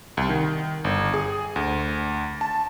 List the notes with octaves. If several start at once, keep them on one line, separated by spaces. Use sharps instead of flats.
C2
D#3
G1
G#4
D2
A5